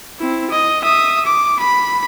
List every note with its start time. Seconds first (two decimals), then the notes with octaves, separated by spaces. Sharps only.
0.19 C4 E4
0.51 D#5
0.82 E5 D#6
1.25 D6
1.59 B5